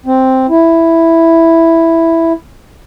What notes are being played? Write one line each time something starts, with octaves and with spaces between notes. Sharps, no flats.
C4
E4